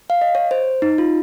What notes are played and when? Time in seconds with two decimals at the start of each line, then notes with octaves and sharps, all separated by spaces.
0.10 F5
0.21 D#5
0.35 C#5
0.51 C5
0.82 D#4
0.98 F4